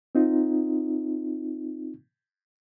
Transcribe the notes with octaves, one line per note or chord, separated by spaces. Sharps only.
C4 D#4 F4